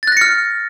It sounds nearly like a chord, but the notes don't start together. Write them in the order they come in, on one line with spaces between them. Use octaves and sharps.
A6 F#6 A#6 C#7 F6